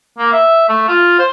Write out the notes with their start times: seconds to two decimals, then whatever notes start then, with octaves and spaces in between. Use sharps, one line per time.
0.18 A#3
0.33 E5
0.69 A3
0.88 F4
1.19 C5